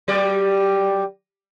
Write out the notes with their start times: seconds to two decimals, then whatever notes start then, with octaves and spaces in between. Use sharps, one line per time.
0.08 F#3 G3 D5